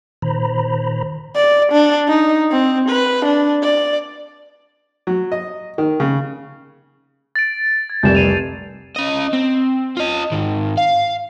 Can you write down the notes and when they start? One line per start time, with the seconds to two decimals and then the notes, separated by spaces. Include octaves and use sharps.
0.22 A#2 D#3 C5 A#5 B5
1.35 D5
1.72 D4
2.08 D#4
2.51 C4
2.89 B4
3.25 D4
3.62 D5
5.07 F#3
5.32 D#5
5.78 D#3
6.00 C#3
7.35 A6 D7
7.90 G#6
8.03 F1 C2 G6 E7
8.15 C7 D#7 F7
8.96 C#4 D#5
9.33 C4
9.97 F4 D#5
10.32 G#2 D#3
10.77 F5